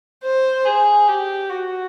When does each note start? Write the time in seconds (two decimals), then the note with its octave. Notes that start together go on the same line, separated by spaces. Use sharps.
0.23 C5
0.66 G#4
1.08 G4
1.49 F#4